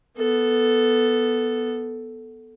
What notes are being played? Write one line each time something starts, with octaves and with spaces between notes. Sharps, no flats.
B3 A4